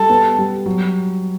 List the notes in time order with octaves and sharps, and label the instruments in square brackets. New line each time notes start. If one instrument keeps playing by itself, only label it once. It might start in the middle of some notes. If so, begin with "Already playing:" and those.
Already playing: [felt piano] G3 [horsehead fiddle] A4
[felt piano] B3
G3
F#3